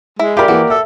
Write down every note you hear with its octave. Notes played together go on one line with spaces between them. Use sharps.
G#3 E4
F4 G4 A#4 D5 E5 B5
E3 A#3 F#4 E5
A4 E5